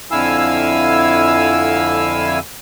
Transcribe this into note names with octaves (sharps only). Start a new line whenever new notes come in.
F2 D3 E4 F5 G#5 E6